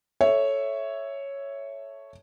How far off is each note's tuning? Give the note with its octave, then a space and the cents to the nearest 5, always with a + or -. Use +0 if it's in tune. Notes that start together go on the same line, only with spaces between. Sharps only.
A4 +0 C#5 +0 E5 +0